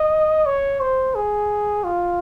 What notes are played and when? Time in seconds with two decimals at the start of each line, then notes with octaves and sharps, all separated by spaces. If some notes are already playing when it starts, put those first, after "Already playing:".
Already playing: D#5
0.46 C#5
0.81 C5
1.15 G#4
1.84 F4